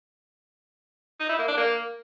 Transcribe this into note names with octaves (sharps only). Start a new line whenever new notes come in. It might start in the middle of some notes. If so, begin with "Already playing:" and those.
D#4
E4
A#3
D4
A#3